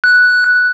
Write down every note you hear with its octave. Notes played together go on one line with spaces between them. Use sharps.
F#6